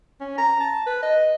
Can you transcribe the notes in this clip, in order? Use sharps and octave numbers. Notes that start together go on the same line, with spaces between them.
C#4
A#5
A5
B4
D#5